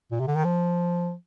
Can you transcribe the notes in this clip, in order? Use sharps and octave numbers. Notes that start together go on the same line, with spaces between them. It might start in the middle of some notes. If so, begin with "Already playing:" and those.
A#2
C3
D3
D#3
F3